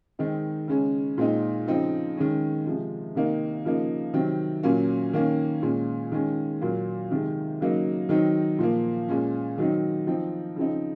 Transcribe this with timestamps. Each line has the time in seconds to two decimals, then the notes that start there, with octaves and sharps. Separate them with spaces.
0.19 D#3 G#3 C4 D#4
0.68 C#3 G#3 C#4
1.18 A#2 G#3 C4 D#4
1.68 C#3 F3 C4 D#4
2.17 D#3 G#3 C#4
2.66 C3 F3 G#3
3.15 C3 D#3 A#3 D#4
3.65 C#3 F3 A#3 D#4
4.14 C3 D#3 F#3 C4
4.63 A#2 F#3 A#3 C#4
5.13 D#3 A#3 C#4
5.62 A#2 G#3 C#4
6.12 D#3 G#3 C#4
6.61 A#2 F#3 A#3
7.11 C3 D#3 G#3
7.61 C#3 F#3 A#3 D#4
8.09 D#3 F#3 C4 D#4
8.59 A#2 F3 A#3
9.09 A#2 G#3 C#4
9.58 D#3 F#3 C4 D#4
10.07 F3 C4 D#4
10.56 C#3 F3 C4 D#4